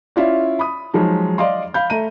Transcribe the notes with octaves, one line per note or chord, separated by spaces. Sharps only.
C#4 E4 F4 D5
B5 D#6
F3 F#3 G#3 D#4
D5 D#5 F5 C6
F5 B5 G6
A3 A#5 D#7